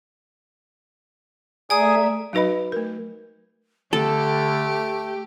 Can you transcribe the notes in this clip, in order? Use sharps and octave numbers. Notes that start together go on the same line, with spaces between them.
A3 G#4 D5 E5 G#5 A#5 D#6
F#3 D#4 F#4 B4 D#5 B5
A3 A#4
D3 A3 G4 A4